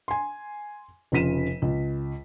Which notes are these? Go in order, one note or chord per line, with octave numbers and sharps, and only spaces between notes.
G#5 C6
F1 C#3 F4 B6 D#7 E7
C#2